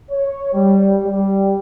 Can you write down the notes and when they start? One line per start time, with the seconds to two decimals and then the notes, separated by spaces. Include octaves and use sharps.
0.10 C#5
0.53 G3
1.03 G3